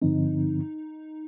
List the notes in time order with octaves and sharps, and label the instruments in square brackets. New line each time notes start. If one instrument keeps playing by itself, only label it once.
[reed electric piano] G2 D3 F3 C4 [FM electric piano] D#4